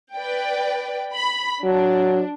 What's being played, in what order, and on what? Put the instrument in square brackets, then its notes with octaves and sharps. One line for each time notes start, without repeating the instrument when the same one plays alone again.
[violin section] B4 D5 G5
B5
[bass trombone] F#3 [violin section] D4